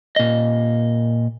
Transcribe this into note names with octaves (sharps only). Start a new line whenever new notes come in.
A#2 D#5